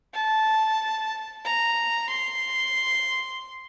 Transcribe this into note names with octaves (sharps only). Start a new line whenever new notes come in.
A5
A#5
C6